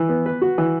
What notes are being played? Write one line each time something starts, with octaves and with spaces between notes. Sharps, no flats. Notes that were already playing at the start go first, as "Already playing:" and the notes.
Already playing: E3
B3
B4
F#4
E3